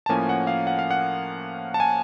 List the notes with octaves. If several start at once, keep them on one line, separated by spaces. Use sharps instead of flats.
A5
A2 F3 A#3 C#4 G#5
F#5
F5
F#5
F5
F#5
A5
G#5